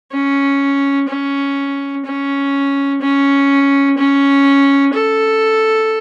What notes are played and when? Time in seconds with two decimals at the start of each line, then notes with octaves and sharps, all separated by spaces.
0.12 C#4
1.08 C#4
2.05 C#4
3.02 C#4
3.97 C#4
4.94 A4